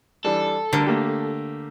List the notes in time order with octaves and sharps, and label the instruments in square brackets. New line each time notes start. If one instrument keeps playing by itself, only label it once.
[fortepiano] E3 G3 D4 [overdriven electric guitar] A4
[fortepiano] D2 G3 A#4 [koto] D3
[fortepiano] A3 A#3 G4